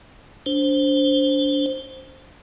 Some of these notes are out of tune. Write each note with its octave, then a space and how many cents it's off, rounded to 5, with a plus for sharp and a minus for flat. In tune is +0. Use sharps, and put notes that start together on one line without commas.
D4 -25 C5 +5